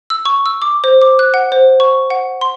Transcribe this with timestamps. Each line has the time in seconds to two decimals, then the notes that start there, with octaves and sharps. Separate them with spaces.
0.10 E6
0.25 C#6
0.46 E6
0.62 D6
0.84 C5
1.01 D6
1.19 F#6
1.34 F#5
1.52 C5
1.80 C#6
2.10 F#5
2.41 C6